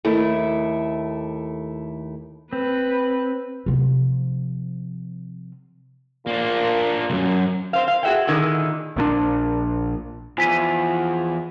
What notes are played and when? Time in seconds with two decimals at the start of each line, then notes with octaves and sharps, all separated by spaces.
0.05 D#2 A3 E4
2.53 C4 B4
3.66 C3 F3
6.27 A#2 A#3 D4
7.10 C2 F#2
7.73 C4 C5 F5
7.88 F5
8.03 F#4 G#4 A#4 E5 F#5 G5
8.27 A#2 D3 D#3 E4 G#4
8.96 A#1 A#2 D#3 D4
10.38 E2 F3 G#5 B6 D#7